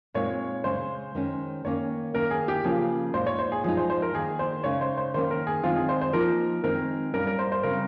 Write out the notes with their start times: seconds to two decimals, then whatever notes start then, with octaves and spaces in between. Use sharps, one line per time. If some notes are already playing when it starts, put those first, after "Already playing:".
0.14 A#2 G#3 C4 D#4 C#5
0.64 C#3 G#3 C#4 C5
1.15 D#3 G#3 C#4
1.64 D#3 A#3 C#4 C#5
2.14 D#3 A#3 C#4 A#4
2.31 G#4
2.48 G4
2.64 C#3 F3 A#3 C#4 G#4
3.14 A#2 G#3 D#4 C5
3.27 C#5
3.39 C5
3.52 G#4
3.64 F3 G#3 D#4 G#4
3.77 C5
3.90 C5
4.02 A#4
4.14 D#3 A#3 D#4 G#4
4.39 C5
4.64 C#3 G#3 D#4 C#5
4.81 C5
4.98 C5
5.14 D#3 A#3 C#4 C5
5.31 A#4
5.47 G#4
5.63 D#3 G#3 C4 D#4 F4
5.76 G#4
5.89 C5
6.01 C5
6.13 F3 A#3 D#4 A#4
6.64 D#3 G#3 C4 D#4 A#4
7.13 A#2 G3 C#4 A#4
7.27 A#4
7.39 C5
7.52 C5
7.63 C#3 G3 C4 D#4 A#4